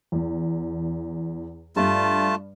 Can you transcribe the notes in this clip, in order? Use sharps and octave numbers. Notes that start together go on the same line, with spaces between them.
E2
G2 G3 A3 F4 A5